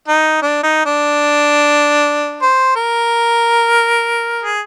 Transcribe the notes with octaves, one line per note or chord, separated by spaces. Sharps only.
D#4
D4
D#4
D4
C5
A#4
G#4